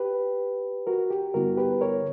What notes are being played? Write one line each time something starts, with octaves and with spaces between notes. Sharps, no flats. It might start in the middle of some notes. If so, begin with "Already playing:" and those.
Already playing: G4 B4
F#4 A#4
G4
G2 D3 G3 B3 E4 F#4 A#4
G4 B4
A#4 C#5